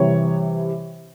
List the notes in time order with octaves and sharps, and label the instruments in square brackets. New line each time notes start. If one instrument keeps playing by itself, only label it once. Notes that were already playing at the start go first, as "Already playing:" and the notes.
Already playing: [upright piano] C3 E3 G3 C#5